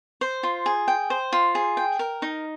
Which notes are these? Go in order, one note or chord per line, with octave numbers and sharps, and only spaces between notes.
C5
F4
G#4
G5
C5
F4
G#4
G5
A#4
D#4